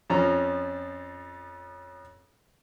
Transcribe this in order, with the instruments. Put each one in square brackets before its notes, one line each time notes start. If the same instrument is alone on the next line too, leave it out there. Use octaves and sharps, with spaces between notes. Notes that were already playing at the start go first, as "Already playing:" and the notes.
[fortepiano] F2 F3 C#4 A#5